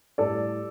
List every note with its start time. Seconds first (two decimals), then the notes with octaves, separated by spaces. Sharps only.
0.18 A2 G3 A4 D5